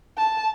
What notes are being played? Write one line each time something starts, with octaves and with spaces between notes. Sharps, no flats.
A5